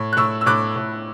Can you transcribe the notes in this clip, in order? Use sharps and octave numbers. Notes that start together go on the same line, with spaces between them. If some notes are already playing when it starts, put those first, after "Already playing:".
Already playing: A2
F#6
A2 C#6 E6
E6
A2 D6 F#6
A2